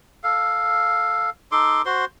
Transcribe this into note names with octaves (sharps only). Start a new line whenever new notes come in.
A4 F5
D#4 A4 C6 D6
F#4 C5 C6